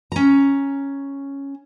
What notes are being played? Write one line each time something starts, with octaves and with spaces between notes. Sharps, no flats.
C#4 A#5